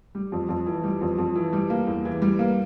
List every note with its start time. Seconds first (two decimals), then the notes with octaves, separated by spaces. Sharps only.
0.15 G3
0.32 F2
0.49 F2
0.66 E3
0.83 G3
1.01 F2
1.19 F2
1.36 E3
1.53 G3
1.70 A#3
1.87 E2
2.05 E3
2.22 G3
2.39 A#3